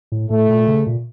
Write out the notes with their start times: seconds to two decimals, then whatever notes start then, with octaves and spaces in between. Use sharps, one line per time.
0.12 A2
0.30 A2 A3
0.49 A#2
0.67 C#3
0.87 A#2